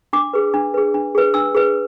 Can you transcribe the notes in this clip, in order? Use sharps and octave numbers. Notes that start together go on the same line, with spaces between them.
D4 D6
G#4 B4
D4
G#4 B4
D4
G#4 B4
D4 E6
G#4 B4